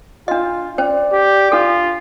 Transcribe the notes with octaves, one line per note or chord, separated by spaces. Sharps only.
D4 F4 D#5
C#4 C5 D5
G4
D4 F4 A4